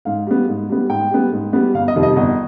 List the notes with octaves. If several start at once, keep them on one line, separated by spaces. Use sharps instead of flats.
G#2 F5
G3 B3
G#2
G3 B3
G#2 G5
G3 B3
G#2
G3 B3
G1 F5
D#5
F2 C3 D#3 G3
D#5
G1 D#5